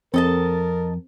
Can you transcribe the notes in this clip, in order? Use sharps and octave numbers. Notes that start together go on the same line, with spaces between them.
F2 C4 A4 A#4 D#5 A5